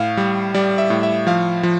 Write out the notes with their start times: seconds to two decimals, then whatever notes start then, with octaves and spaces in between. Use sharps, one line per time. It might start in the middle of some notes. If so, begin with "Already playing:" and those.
Already playing: A2 F5
0.17 G3
0.54 G3 D5
0.78 E5
0.90 A2
1.03 E5
1.27 F3 F5
1.63 F3